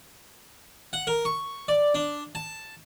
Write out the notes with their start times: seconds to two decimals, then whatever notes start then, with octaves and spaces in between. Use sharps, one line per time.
0.93 F#5
1.07 A#4
1.25 C#6
1.68 D5
1.94 D4
2.35 A5